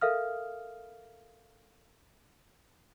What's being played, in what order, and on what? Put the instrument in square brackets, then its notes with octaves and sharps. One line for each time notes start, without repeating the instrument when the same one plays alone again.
[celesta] A4 A#4 E5 F5 D#6 F6